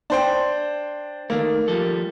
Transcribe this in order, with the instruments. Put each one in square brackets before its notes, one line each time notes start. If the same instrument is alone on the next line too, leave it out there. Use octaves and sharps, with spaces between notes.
[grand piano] D4 C5 G5
[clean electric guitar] D#3 A3 [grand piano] A#3
[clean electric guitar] F3 G3 A4